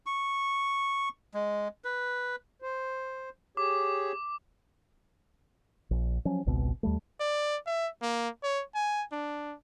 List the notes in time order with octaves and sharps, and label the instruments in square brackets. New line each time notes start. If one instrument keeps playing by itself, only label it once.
[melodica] C#6
G#3
B4
[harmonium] C5
[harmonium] G4 G#4 C#5 [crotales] D6
[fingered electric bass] A#1
F3 F#3 C#4
G#1 C#2 B2 C4
D#2 G3 A3
[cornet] D5
E5
A#3
C#5
G#5
D4